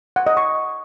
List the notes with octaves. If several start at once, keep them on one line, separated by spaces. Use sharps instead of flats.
F#5
D#5
C#6